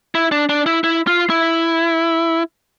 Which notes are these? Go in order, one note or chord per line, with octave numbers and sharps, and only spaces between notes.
E4
D4
D4
E4
E4
F4
E4